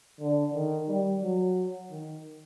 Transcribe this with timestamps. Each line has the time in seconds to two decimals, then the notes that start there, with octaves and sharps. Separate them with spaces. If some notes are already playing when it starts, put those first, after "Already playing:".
0.20 D3
0.54 D#3
0.88 G3
1.22 F#3
1.91 D#3